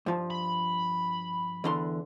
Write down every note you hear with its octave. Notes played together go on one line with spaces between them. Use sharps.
G2 F3
B5
E2 D3 C6